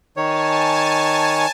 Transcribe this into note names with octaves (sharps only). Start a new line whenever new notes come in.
D#3 C#5 G#5 A5